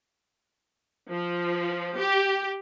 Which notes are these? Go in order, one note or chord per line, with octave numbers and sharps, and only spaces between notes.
F3
G4